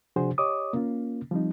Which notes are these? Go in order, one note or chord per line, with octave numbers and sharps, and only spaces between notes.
C3 F3 D4 F#4 G#4 C5
G4 C#5 D#5 D6 D#6
A#3 C#4 F4
F3 G3 C4 D#4